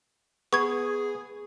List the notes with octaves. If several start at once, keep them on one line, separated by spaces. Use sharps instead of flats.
B3 G#4 C#6 G#6